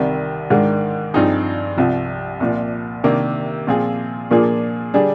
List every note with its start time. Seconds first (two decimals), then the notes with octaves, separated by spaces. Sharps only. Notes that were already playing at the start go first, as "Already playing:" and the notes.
Already playing: C2 C3 D#3 G3
0.50 G#2 D#3 G#3 D4
1.14 G2 F3 C4 D#4 G#4
1.77 C2 C3 F3
2.40 C2 A#2 F3
3.04 C3 D#3 A#3 D4
3.67 A#2 F3 C4 F4 G#4
4.31 A#2 F3 A#3 D4 G#4
4.94 D3 G3 D4 G#4